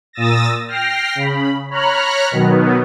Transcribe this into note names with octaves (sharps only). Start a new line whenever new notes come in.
A#2 D#6 E6 A6 A#6
G5 F6 A#6 C7
C#3 B5
C#5 A#5 B5 F6 F#6
B2 D#3 F#3 B3